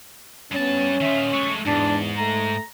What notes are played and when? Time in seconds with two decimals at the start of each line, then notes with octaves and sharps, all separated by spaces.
0.52 G2 B3 C#4 A5
1.01 D#3 F4 E5
1.33 G#3 A3 C#6
1.66 E2 G#2 D4
2.17 A3 A#5